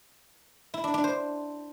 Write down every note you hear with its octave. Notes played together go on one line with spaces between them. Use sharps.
E4
D4
D4
C5